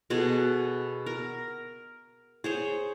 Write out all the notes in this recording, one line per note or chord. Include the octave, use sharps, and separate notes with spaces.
B2 F#4 G#4 A4
A#4
G#4 C5 C#5